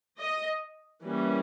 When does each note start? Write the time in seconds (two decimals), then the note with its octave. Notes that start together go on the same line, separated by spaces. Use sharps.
0.19 D#5
1.03 E3 G3 A#3 C#4